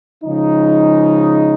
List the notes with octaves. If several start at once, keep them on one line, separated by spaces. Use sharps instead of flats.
C#3 F3 G#3 D#4